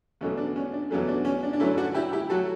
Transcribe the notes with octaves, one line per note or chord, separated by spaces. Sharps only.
E2 B2 F#3 A3 C#4
D4
C#4
D4
E2 B2 F#3 A3 C#4
D4
C#4
D4
D4
G2 F#3 A3 C#4 E4
D4 F#4
E4 G4
E4 G4
F#3 A3 F#4 A4